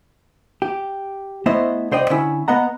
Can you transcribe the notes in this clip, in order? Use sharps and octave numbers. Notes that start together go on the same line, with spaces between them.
G4
A3 B3 E4 C5 D#5
C2 C5 D5 D#5 G5
D3 C#4 E4
B3 D#5 F#5 A#5